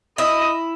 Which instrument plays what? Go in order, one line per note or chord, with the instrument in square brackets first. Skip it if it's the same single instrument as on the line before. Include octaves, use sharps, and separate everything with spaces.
[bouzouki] E4 [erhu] D#5